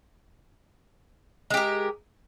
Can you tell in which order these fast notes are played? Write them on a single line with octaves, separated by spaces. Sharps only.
G#3 G4 A#4